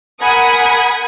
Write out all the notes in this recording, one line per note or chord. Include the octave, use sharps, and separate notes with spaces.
A#4 F#5 G#5 B5 D#6 G#6